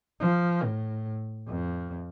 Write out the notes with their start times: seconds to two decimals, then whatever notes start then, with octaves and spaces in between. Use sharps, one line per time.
0.20 F3
0.63 A2
1.48 F2